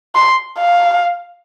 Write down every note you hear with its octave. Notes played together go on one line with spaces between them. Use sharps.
C6
F5